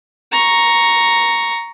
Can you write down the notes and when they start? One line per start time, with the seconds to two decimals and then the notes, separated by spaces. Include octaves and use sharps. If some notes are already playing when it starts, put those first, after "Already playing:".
0.32 A#5 C#6